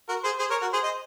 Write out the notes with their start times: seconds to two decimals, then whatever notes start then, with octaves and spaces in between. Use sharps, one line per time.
0.09 F#4 A#4
0.24 G#4 C5
0.39 G#4 C5
0.50 A#4 C#5
0.61 F#4 A#4
0.73 G#4 C5
0.84 C5 D#5